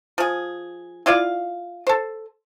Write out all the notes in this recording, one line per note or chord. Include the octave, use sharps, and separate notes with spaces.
F3 G#4
E4 F4 D5 F5
A4 C5